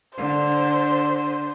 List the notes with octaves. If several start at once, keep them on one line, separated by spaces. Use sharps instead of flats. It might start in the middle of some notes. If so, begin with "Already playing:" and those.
D3 C5